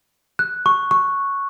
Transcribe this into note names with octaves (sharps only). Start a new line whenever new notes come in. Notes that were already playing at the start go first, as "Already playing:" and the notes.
F#6
C#6
C#6